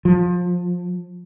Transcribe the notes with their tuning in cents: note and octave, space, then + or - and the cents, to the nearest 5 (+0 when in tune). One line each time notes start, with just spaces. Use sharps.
F3 +25